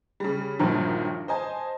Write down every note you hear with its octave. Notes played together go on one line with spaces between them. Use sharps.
C#3 G3
A#1 G2 A#2 D#3 F3 F#3
C5 D#5 G#5 A5